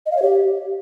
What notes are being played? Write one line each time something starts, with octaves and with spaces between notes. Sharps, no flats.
D#5
F5
C#5
G4